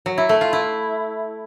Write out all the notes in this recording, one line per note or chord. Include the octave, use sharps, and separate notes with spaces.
F#3
E4
A3
F4
E4